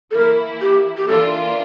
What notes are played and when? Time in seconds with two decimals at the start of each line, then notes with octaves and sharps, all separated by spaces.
0.11 A4
0.14 E3 A#3 E4 A#4
0.62 G4
0.97 G4
1.08 E3 A#3 D4 F4 A4